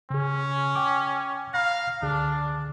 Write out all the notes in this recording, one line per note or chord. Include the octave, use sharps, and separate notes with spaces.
C#3 C#4 G#4
G5 D6
F5 A#5 B5 A#6
C#2 D3 D4 G#4